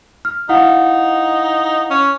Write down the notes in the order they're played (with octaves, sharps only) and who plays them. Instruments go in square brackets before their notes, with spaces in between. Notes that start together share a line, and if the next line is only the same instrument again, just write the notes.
[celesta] F6
[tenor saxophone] D#4 [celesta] E4 F5 F#5
[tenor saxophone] C#4